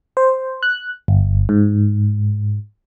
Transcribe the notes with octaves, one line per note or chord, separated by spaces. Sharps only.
C5
F#6
G1
G#2